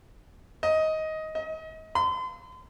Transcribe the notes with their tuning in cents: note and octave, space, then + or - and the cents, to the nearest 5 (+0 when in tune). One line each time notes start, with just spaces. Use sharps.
D#5 +15
D#5 +35
C6 -40